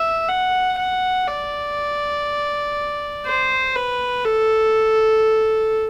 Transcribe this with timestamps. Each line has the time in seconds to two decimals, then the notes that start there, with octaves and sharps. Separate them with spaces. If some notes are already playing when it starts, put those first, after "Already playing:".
Already playing: E5
0.28 F#5
0.78 F#5
1.28 D5
3.26 C5
3.76 B4
4.25 A4